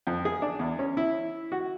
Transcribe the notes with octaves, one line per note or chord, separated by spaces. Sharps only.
F2
G#4
D4
E2
C#4
E4
F#4